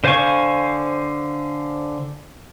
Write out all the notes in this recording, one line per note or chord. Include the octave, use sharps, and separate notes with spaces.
D3 C5 F5 G#5 C#6